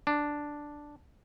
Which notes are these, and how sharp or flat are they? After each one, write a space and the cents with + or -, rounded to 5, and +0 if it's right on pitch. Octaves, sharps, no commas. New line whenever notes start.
D4 +0